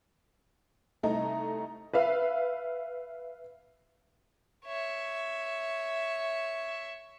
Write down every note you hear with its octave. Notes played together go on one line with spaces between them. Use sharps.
C2 A3 D#4 D#5 A#5
B4 E5 F5
C#5 E5